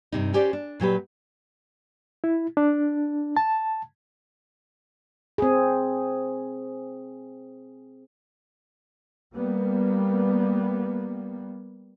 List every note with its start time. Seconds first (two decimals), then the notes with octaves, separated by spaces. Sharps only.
0.12 G2 C3 D#4
0.34 C#4 G4 C5 D5
0.53 D4
0.80 A#2 F#3 G4 B4
2.24 E4
2.57 D4
3.37 A5
5.38 C4 G#4
9.34 G3 A#3 B3